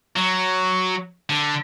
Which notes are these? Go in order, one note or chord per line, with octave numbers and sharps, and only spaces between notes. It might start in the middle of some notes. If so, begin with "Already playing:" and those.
F#3
D3